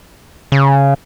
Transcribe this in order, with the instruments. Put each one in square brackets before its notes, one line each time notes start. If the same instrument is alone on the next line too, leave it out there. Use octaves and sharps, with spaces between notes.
[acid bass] C#3